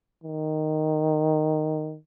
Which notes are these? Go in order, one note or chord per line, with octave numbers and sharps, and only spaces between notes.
D#3